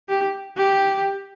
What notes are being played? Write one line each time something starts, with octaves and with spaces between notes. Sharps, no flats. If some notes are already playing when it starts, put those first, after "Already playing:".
G4
G4